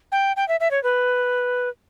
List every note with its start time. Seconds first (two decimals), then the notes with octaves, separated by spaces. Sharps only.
0.12 G5
0.36 G5
0.48 E5
0.60 E5
0.71 C#5
0.84 B4